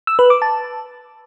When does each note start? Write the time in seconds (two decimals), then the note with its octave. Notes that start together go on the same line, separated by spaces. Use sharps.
0.07 E6
0.19 B4
0.30 D6
0.42 A5